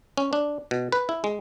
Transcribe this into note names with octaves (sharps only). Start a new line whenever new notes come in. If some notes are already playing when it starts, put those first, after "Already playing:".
C#4
D4
B2
B4
E4
G#3